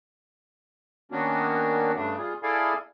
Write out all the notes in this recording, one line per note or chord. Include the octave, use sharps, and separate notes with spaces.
D#3 A#3 B3 C#4 D4 F#4
G2 C#3 A3 D4
G3 F4 G#4
E4 G#4 A4 D5 F5 G#5